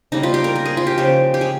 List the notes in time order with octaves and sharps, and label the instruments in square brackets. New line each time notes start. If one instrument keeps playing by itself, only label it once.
[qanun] C#3 G3 A#3 D#4
F4
G4
A#4
A#4
G#4
F4
G4
C#3 F3 G#3 G4
G4
G#4